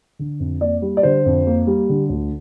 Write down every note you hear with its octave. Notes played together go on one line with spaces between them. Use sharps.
D3
F2
A#3 D5
G3
D5
D3 C5
F2
A#3
G3
D3
D2